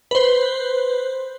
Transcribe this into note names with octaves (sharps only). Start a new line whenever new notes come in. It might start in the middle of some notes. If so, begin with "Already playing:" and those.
B4 C5